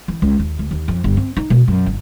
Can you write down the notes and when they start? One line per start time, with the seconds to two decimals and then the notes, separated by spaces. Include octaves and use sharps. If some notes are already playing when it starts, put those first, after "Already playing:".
0.08 E3
0.22 C#2
0.40 D#2
0.59 D2
0.71 D#2
0.88 F2
1.04 G1
1.17 C4
1.37 D#4
1.50 B2
1.68 F#2
1.86 G1